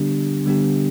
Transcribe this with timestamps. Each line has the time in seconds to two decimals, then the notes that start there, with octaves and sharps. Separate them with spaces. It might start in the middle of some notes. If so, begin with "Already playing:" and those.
Already playing: D3 G3 B3 D4 G4
0.46 D3 G3 B3 D4 G4